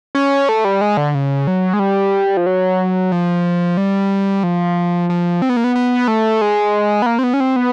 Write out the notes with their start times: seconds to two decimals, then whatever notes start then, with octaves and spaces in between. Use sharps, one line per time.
0.15 C#4
0.49 A3
0.65 G3
0.81 G#3
0.97 D3
1.15 C#3
1.47 F#3
1.74 G#3
1.79 G3
2.37 F3
2.46 F#3
3.12 F3
3.77 G3
4.43 F3
5.09 F3
5.42 C4
5.49 B3
5.56 A#3
5.64 B3
5.75 B3
6.08 A3
6.41 G#3
7.02 B3
7.06 A#3
7.19 C4
7.24 B3
7.34 C#4
7.40 C4
7.56 B3